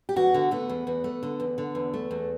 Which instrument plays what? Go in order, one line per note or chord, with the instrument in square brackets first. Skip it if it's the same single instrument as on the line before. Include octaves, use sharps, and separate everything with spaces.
[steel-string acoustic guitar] G4
E2 F#4
D3
A3 B3
E2
E2
A3
D3
E2
D3
E2
A3
E2